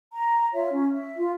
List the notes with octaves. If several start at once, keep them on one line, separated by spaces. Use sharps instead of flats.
A#5
F4 C#5 E5
C#4
E5
F4